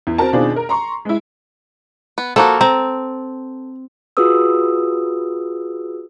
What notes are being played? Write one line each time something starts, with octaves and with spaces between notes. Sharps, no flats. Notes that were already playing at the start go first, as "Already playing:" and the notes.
E2
C4 F#4 A#4 A5
B2 D#3 C4 D4 F4 G#4
A#4
A#5 C6 C#6
G#3 E4
B3
F3 A#3 F#4 A4 G5
C4 A#5
F4 F#4 G#4 B4 D#6 E6